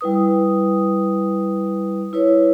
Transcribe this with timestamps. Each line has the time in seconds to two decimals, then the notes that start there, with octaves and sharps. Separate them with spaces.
0.01 G3 E4 B4 D#6
2.13 E4 B4 C#5